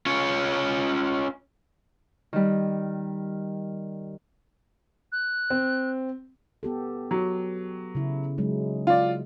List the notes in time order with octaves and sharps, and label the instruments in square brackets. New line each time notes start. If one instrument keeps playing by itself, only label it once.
[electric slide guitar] C#4 F4 C#5
[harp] D#3 G3
[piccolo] F#6
[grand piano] C4
[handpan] B3 G4 A4
[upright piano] F#3
[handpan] C#3 E4
F#3 G#3 D#4
[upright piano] F4 D5